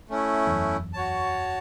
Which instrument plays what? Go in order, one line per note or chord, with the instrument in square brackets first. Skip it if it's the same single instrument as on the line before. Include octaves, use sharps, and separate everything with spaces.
[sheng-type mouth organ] A3 C#4 E4
[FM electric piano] E2
F#2
[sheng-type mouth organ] F#4 C#5 A5